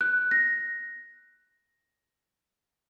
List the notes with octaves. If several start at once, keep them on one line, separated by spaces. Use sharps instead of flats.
F#6
A#6